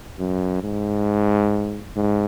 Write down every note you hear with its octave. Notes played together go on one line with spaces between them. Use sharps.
F#2
G#2
G#2